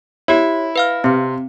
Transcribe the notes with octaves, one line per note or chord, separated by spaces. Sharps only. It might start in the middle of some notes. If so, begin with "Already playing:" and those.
E4 G4 C#5
B4 F5 F6
C3 C4